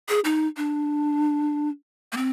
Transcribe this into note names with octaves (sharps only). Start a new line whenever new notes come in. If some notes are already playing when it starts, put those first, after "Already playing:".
G#4
D#4
D4
A#3
C4